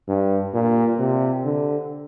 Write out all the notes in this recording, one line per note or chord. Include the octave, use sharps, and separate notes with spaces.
G2
A#2
C3
D3